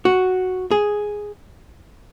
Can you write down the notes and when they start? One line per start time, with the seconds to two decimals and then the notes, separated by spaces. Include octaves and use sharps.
0.05 F#4
0.71 G#4